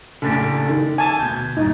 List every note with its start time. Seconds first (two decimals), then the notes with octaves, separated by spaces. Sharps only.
0.22 A#1 F#2 A2 C#3 D4 G4
0.69 D#3
0.98 G#5 A5
1.19 D2 B2 G6 G#6
1.57 B1 G2 A#2 D#4